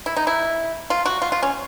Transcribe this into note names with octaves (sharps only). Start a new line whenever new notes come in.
E4
D#4
E4
F4
F#4
F4
F4
C#4